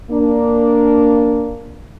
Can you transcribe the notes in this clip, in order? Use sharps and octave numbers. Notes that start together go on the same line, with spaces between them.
A#3 D4